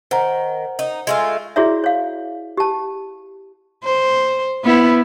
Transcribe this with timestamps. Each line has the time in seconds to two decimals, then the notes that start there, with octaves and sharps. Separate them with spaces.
0.11 D#3 C5 F#5 A#5
0.79 D#4
1.07 G#3 A3 F4
1.56 E4 F#4 G#4 C#5 D5 E5
1.84 C#5 F5
2.57 G4 A5
3.84 C5
4.64 B3 E4